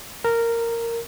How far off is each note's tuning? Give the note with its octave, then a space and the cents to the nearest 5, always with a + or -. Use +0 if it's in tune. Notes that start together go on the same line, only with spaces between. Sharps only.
A#4 -10